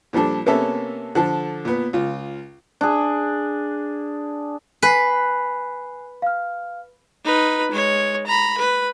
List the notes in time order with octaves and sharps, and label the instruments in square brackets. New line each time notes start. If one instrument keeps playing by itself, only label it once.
[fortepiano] A#2 F3 G3 D4 A4
C3 A#3 B3 C#4 A4 E5
D3 F3 A4
A#2 B3
C#2 F4
[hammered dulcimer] D4 G#4
[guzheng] B4 [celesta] G#5 F#6 C7
[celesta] F5 F6
[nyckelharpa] D#4 B4
G#3 C#5
A#5 B5
B4